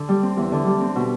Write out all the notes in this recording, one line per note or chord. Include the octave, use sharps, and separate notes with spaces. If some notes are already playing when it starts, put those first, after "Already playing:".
Already playing: D3
G3
C4
E2
D3
G3
C4
B2